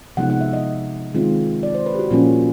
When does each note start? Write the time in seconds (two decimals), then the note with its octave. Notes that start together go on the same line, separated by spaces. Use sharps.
0.17 C3 F3 G#3 B3 D#4 F#5
0.30 F#5
0.41 E5
0.53 D#5
1.15 D#3 G#3 C4 F4
1.63 D5
1.74 C5
1.86 B4
1.95 G4
1.99 F#4
2.11 A#2 F3 A#3 C#4 F4